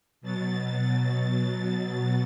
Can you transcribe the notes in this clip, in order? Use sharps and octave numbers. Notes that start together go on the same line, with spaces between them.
B2 F#3 A6